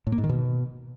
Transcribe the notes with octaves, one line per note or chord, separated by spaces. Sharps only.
A2
A#3
G#2
D#3
B2